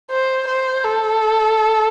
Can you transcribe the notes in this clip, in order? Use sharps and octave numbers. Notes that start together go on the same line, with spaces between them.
C5
C5
A4